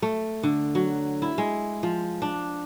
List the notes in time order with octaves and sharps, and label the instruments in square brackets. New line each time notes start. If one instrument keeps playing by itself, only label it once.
[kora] A3
D3
F#3
E4
G#3
F3
D4